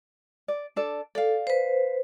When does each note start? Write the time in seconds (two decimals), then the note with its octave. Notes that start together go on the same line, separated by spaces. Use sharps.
0.48 D5
0.76 D4 A4 D5
1.15 A4 D5 F5
1.47 B4 C5